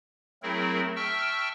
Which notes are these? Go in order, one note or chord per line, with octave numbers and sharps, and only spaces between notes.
F#3 A3 C4 E4 G#4 A#4
E5 G5 A5 C#6 E6 F6